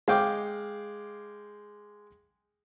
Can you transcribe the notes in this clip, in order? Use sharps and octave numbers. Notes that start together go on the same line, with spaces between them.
G#3 F5 G5 D6